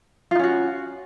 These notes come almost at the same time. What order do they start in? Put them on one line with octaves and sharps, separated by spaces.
F4 D#4 C#4 F#4